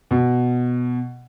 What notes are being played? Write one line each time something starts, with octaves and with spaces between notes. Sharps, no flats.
B2